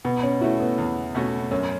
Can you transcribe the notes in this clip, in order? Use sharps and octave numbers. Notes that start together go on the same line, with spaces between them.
B2 B3
C#4
A3 E4 F#4
B3
E2
B2 A3 C#4 F#4
F#2 C#4